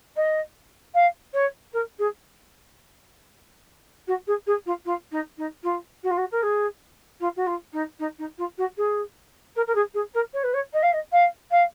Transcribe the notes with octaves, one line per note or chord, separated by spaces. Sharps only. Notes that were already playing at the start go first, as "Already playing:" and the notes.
D#5
F5
C#5
A#4
G#4
F#4
G#4
G#4
F4
F4
D#4
D#4
F4
F#4
F4
F#4
A#4
G#4
F4
F#4
F4
D#4
D#4
D#4
F4
F#4
G#4
A#4
A#4
G#4
G#4
A#4
C#5
B4
C#5
D#5
F5
D#5
F5
F5